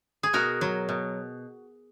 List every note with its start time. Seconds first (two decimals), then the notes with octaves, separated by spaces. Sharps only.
0.23 G#4
0.33 B2 F#4 A#4
0.61 F#3
0.89 B2